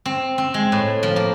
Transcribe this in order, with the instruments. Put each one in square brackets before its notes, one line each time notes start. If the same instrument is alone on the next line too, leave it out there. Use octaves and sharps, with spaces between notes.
[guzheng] C4
C4
G#3
A2
F3
A#3